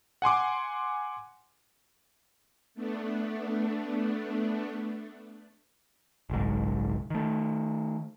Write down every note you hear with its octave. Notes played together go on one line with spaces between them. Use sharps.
F#5 G#5 C6 D6
A3 B3 D4
F#1 B1 G#2
D#3 A3